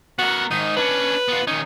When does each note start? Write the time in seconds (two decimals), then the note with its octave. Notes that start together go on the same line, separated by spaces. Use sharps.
0.19 B3 F#4 A#4
0.51 G#2 D#3 D#4
0.77 C#4 D4 B4
1.28 B3 F4
1.47 D#3 C#4 D#4